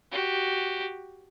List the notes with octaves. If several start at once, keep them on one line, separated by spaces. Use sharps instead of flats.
F#4 G4